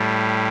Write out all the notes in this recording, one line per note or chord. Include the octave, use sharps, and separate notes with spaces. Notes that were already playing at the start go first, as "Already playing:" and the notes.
Already playing: A2 G3